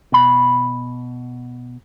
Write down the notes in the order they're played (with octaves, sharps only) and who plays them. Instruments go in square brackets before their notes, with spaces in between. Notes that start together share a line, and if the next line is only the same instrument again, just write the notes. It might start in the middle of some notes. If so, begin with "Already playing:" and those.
[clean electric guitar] B2 B5